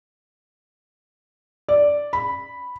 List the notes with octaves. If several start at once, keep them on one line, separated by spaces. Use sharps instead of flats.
D5
B5